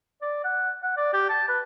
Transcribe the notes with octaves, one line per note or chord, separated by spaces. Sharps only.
D5
F#5
F#5
D5
G4
A5
B4